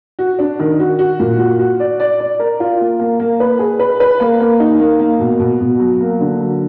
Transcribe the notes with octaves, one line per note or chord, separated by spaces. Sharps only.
F#4
D4
D#3
F#4
F#4
A#2
F#4
F#4
D5
D5
D5
A#4
F4
A#3
A#3
A#3
B4
G#4
B4
B4
A#3
A#3
D#4
A#3
A#3
B2
B2
B2
F#3
A#3
D3
F#3